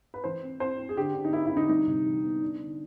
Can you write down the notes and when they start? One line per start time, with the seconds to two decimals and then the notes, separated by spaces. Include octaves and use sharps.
0.14 B4
0.24 E3 C5
0.43 C4
0.60 C4 C5
0.79 C4
0.89 G#4
0.97 D3 G4
1.15 D3
1.24 D#4
1.33 A#3 E4
1.46 E4
1.52 D3 D#4
1.69 G3 D#4
1.87 C3
2.06 E3
2.24 B3
2.42 D4
2.60 D3